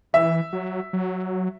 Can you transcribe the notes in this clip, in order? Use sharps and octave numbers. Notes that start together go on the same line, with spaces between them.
E3 E5
F#3
F#3